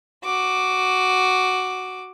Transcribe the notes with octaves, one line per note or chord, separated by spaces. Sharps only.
F#4 D6